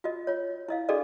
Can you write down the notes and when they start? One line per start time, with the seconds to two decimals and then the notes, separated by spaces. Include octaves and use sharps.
0.04 F4 F#4 D#5
0.27 F4 C#5
0.69 E4 D#5 F5
0.89 D4 F#4 G#4 A4 D5 D#5